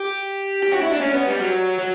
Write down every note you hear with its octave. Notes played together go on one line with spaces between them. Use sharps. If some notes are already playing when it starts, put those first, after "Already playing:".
Already playing: G4
G4
F#4
E4
D4
C#4
B3
G3
F#3
F#3